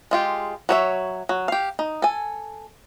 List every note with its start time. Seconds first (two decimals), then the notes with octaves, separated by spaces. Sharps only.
0.11 G#3 F4 G4
0.69 F#3 C#5 E5
1.29 F#3
1.48 G4 F5
1.79 D#4
2.02 A4 G#5